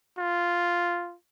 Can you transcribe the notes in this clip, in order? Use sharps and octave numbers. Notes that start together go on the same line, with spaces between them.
F4